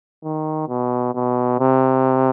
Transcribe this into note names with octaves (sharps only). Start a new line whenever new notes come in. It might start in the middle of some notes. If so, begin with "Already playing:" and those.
D#3
B2
B2
C3